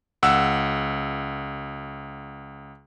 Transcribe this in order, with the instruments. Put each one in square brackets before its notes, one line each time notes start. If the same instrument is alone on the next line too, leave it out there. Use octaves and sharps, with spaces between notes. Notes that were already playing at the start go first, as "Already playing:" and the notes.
[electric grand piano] C#2 F#5 E6